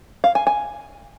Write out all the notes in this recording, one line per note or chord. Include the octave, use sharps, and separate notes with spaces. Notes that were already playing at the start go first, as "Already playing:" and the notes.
F5
G#5
G#5